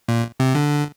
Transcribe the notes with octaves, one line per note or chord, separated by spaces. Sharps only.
A#2
C3
D3